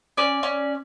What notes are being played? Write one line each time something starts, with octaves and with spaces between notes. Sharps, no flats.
C#4 D5
C#4